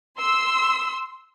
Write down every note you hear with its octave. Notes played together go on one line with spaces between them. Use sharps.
C6 E6